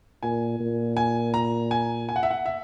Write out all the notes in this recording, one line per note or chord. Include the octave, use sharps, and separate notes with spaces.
A#2 G#5
A#2
G#5
A#5
G#5
G#5
F#5
E5
F#5
E5